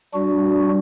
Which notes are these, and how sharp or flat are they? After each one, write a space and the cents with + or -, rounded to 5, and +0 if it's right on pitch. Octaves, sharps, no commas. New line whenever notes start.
G3 -25 D4 +0 F#4 +0